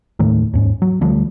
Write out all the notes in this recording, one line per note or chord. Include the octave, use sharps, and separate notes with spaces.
D#2 A2 D#3 A3
D#2 G#2 C#4
F#3
D2 F3 G3 A3